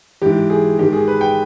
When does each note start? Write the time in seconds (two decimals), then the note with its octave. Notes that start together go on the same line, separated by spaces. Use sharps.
0.22 G#2 E3 G4
0.50 G#4
0.78 G#2 D#3 G4
0.93 G#4
1.08 B4
1.21 G5